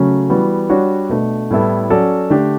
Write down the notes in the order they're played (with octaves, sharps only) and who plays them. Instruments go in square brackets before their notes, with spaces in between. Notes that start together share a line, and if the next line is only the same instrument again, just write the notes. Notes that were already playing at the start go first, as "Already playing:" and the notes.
Already playing: [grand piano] C#3 F#3 A3 C#4
E3 G3 B3 F#4
G3 D4 F#4 C#5
B2 A3 D4
A2 G3 B3 E4 A4
F#3 C#4 F#4 A4 D5
D3 A3 D4 G4